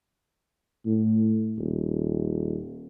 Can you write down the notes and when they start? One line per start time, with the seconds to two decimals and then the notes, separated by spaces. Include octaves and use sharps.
0.85 A2
1.58 D#1